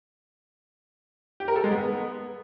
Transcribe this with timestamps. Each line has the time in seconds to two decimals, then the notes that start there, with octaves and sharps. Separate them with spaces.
1.40 G4
1.48 A#4
1.56 A4
1.64 G#3
1.72 B3